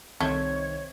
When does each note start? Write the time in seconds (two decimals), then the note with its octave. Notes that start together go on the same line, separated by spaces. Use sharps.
0.21 C2 D#3 A3 C4 C#5 E5 G#6